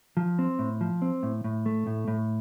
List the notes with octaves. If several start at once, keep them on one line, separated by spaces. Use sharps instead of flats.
F3
C4
A2
F3
C4
A2
A2
A3
A2
A2